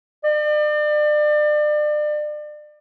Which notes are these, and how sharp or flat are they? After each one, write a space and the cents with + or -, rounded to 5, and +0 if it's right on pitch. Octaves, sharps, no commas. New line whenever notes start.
D5 +35